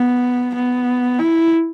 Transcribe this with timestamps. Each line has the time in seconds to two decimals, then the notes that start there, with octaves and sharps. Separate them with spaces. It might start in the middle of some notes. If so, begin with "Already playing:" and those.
Already playing: B3
0.55 B3
1.19 E4